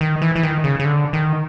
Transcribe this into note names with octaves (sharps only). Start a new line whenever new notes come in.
D#3
E3
E3
D#3
C#3
C#3
D3
D#3